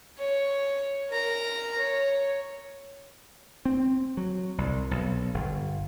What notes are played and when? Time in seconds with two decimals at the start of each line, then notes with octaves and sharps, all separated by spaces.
0.18 C#5
1.10 A#4 A#5
1.78 C#5
3.65 C4
4.17 F#3
4.58 C2
4.91 B1
5.34 G1